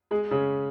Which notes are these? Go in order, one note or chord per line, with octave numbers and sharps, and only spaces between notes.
G#3 G#4
C#3 C#4